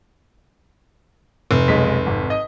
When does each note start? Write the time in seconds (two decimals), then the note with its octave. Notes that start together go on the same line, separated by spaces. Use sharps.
1.51 F1
1.68 B1 G#3 B6
2.07 G#1
2.30 D#5